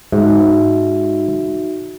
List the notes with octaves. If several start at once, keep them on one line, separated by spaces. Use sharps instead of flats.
G#2 D#4 F#4 E5